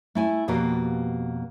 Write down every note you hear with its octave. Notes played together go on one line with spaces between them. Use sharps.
A3 E4 G#5
F2 B2 A#3 F#4 G4 B4